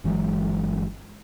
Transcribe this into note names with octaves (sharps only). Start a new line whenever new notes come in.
G1 E3 F#3 G#3